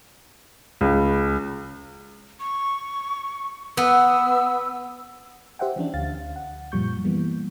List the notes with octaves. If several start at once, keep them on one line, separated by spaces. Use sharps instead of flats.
C#2
C#6
B3 E6
G4 C5 E5 F#5 G5
E3 F3 C#4 D4
D2 D3 F5 A6
F#5
F#2 A#2 F3 G3 C#6 G6
E3 G3 A#3 B3